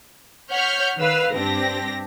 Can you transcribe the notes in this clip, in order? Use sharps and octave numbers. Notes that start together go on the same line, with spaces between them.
C#5 F#5 F6 G6 B6
D#3 B4 F5 E6
G2 C4 D4 G4 A#6